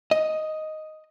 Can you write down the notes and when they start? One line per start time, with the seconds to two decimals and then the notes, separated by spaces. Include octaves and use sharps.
0.11 D#5